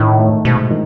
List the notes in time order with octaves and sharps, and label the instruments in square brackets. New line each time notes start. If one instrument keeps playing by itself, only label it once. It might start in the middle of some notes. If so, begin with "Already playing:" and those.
Already playing: [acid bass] A2 [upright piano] D#3
[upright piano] A3
[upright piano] G#2 [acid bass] B2
[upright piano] D#3